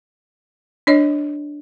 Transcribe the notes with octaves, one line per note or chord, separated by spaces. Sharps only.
D4 C#5 D#5